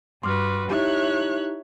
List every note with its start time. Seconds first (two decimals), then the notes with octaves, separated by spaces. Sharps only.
0.23 G2 F#4 B4 C6 D6 F6
0.70 D#4 E4 G4 C#5 E5 F#6